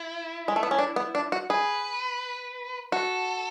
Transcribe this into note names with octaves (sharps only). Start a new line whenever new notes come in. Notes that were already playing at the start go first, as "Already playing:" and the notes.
Already playing: E4
G#3
A3
B3
C#4
D4
B3
D4
F#4
G#4 B4
F#4 A4